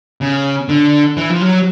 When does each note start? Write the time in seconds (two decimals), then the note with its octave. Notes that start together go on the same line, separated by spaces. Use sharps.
0.21 C#3
0.68 D3
1.17 E3
1.30 F3
1.41 F#3